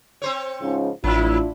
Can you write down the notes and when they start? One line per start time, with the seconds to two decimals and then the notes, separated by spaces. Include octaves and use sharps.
0.22 C4 C5 C#5
0.62 G#2 C#3 F3
1.04 A1 F3 D4 E4 F4